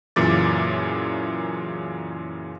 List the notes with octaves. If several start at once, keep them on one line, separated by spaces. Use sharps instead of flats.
F#2 A#2 C#3 E3 D6 A6